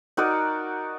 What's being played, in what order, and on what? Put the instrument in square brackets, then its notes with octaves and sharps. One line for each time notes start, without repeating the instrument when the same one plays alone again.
[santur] D#4 F#4 A#4 D5